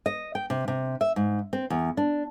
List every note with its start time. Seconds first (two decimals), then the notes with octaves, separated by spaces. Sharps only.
0.06 D#5
0.35 G5
0.50 C3
0.68 C3
1.01 E5
1.16 G#2
1.53 C4
1.70 E2
1.97 D4